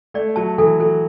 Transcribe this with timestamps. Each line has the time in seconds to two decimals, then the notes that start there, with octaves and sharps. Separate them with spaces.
0.14 A3 D5
0.36 F#3 A5
0.58 E3 A4
0.80 F#3 A4